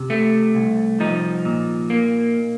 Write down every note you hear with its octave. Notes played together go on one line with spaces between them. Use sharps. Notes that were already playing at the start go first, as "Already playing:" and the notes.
Already playing: C3
A3
C2
F3 D#4
A#2
A#3